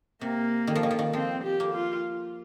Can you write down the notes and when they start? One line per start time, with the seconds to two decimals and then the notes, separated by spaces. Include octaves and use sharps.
0.21 C3 A#3
0.67 D#3
0.75 F3
0.83 D#3
0.91 F3
0.99 D#3
1.13 F3 C4
1.44 G4
1.60 A#3
1.74 F4